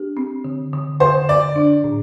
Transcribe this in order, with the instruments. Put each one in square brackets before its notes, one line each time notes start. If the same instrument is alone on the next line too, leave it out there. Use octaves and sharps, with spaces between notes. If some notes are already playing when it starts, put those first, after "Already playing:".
Already playing: [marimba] D4 G4
C4
D3
D3
[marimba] D3 [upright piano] C5
[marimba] D3 [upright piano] D5
[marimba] D4
A2